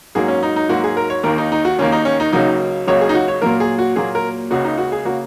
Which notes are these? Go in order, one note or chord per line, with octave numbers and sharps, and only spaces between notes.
G#2 F#3 A#3 G#4
C#4
D#4
D#4
G#2 F#3 A#3 F#4
G#4
A#4
C#5
D#2 D#3 A#3 A#4
D#4
D#4
F#4
D#2 D#3 A#3 C#4
D#4
C#4
D#4
C#2 C#3 F#3 A#3 D#4
C#2 C#3 F#3 A#3 C#5
G#4
D#4
F#4
C#5
A#2 F#3 A#3 A#4
G#4
F#4
A#2 F#3 A#3 G#4
A#4
C#2 C#3 A#3 F#4
D#4
F#4
G#4
C#3 A#3 F#4